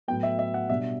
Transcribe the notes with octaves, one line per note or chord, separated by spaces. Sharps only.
A2 F#3 B3 G5
E5
E5
F#5
B2 G3 D4 E5